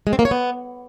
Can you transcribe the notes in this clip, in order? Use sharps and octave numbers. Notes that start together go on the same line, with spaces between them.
G#3
C4
A#3
C#5
B3